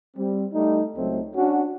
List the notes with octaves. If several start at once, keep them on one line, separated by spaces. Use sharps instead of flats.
G3 C4
G3 A3 D#4
C#2 F#3 A3 C4
C#4 D4 F#4